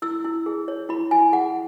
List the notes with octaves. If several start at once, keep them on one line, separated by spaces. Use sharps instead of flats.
E4 E6
E4
G#4
C#5
E4 B5
E4 G#5
G#4 F#5